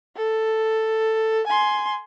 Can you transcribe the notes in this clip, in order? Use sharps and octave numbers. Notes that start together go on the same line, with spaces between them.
A4
G#5 C6